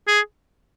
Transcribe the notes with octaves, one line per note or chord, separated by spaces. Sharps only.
G#4